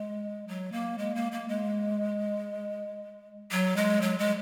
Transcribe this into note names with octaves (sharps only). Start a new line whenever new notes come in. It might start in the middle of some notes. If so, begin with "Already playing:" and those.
Already playing: G#3
F#3
A#3
G#3
A#3
A#3
G#3
F#3
G#3
F#3
G#3